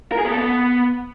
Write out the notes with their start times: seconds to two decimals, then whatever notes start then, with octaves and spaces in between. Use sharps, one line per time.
0.12 A#4
0.19 G#4
0.25 B3
0.32 A4
0.38 B3